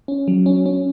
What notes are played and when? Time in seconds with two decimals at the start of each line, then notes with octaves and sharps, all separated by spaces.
0.08 C#4
0.28 F#3
0.46 C#4
0.66 C#4